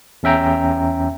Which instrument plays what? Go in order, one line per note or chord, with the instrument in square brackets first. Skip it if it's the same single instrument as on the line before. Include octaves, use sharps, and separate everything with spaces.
[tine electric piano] E2 C#4 E5 G5 A#5